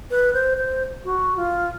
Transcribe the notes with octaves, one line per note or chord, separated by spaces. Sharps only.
B4
C5
C5
F#4
F4